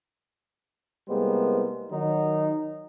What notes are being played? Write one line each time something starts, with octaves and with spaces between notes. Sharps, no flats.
C2 G3 G#3 A#3 B3 C5
D#3 F#3 D#4